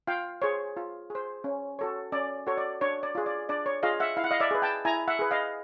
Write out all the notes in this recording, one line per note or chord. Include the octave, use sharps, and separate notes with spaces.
F4 F5 G5
G#4 C5 C#5
F4
G#4 C5
C#4
F#4 A4 C#5
C#4 D5
F#4 A4 C#5
D5
D4 C#5
D5
F4 G#4
D5
D4 D5
C#5
F4 G#4 D#5 F5
E5 F#5
E4 F5
F#5
D#5 F5
D5 E5
G#4 B4
G5 A5
E4 G#5 A#5
E5 F#5
G#4 B4
D#5 F5